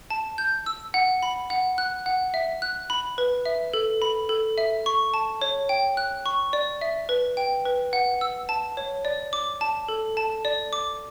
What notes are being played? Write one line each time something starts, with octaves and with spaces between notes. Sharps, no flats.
A5
G6
E6
F#5
B5
F#5
F#6
F#5
E5
F#6
B5
B4
E5
A4
B5
A4
E5
C#6
A5
C#5
G5
F#6
C#6
D5
E5
B4
G5
B4
F#5
E6
A5
C#5
D5
D6
A5
A4
A5
D5
D6